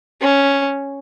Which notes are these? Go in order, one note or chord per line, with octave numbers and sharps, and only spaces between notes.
C#4